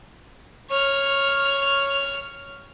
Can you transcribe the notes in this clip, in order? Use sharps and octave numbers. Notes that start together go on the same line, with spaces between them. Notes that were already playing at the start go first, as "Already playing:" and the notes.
C#5 F6